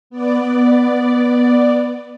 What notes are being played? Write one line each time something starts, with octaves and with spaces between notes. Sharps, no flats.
B3 D5